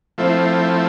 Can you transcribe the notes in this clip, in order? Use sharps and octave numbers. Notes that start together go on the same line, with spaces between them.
F3 A3 C4 E4